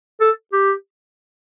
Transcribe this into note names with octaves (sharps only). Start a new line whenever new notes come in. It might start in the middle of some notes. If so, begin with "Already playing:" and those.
A4
G4